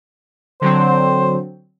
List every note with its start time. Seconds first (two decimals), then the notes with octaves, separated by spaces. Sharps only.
0.61 D3 F#3 C4 C5